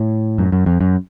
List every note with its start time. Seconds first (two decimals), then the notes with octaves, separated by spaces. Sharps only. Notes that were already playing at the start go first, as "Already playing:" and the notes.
Already playing: A2
0.38 F#2
0.52 F#2
0.66 F2
0.81 F#2